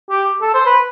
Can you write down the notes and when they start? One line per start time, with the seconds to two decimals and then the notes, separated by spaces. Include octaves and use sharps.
0.10 G4
0.42 A4
0.54 C5
0.66 B4